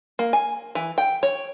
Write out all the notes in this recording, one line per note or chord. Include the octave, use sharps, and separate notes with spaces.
A#3
G#5
E3
G5
C#5